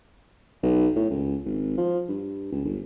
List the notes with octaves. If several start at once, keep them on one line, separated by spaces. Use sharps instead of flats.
B1
A2
C#2
G#1
F3
G2
C#2
G1